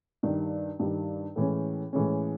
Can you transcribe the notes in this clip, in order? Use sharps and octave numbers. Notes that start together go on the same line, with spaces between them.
G2 D#3 G3
G2 D#3 G3
A2 E3 G#3 C#4
A2 E3 G#3 C#4